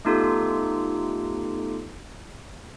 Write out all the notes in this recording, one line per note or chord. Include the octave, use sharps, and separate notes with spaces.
A3 B3 D#4 F4 G4 A4